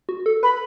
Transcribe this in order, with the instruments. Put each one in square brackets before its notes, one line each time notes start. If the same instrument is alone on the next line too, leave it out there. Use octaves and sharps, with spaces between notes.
[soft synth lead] F#4
A4
[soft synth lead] B4 [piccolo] B5